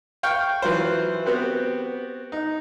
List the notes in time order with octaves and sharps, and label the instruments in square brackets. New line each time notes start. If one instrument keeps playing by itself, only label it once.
[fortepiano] F5 G5 C#6 F6
E3 F#3 F4 C5
B3 C4 F#4 G4
D#4